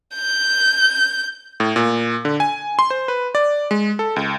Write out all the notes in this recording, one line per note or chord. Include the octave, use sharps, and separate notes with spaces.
G6
A2
A#2
D3
G#5
C6
C5
B4
D5
G#3
A4
C#2